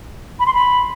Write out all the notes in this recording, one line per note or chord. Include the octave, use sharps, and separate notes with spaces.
B5
C6
B5